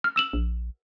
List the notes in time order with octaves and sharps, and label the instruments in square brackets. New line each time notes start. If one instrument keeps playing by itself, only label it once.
[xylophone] F6
E6 E7 F#7
[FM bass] A#1